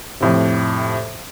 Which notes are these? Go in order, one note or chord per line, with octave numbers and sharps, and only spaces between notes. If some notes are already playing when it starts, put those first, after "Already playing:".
F2 A2 C3